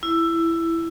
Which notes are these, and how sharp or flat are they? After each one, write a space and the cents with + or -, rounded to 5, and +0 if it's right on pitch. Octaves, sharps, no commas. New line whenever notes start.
E4 +10